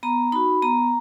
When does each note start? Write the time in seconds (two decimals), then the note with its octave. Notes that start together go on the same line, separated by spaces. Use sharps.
0.03 B3 A#5
0.32 D#4 F#4 B5
0.62 B3 A#5